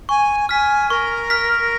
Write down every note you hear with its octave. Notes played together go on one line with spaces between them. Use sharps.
G#5 C#6
G#5 F6 B6
A#4 C#6
F6 B6